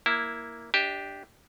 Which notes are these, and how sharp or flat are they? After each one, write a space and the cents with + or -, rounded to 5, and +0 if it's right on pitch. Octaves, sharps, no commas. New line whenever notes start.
A#3 +0 E4 +0
D4 +0 G4 +0 E5 -40